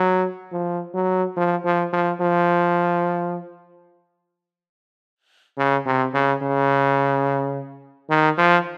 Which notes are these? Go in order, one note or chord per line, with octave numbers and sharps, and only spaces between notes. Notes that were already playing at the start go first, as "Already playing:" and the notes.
Already playing: F#3
F3
F#3
F3
F3
F3
F3
C#3
C3
C#3
C#3
D#3
F3